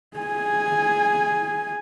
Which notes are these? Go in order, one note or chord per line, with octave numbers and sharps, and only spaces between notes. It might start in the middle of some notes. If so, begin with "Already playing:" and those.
G#4 G#5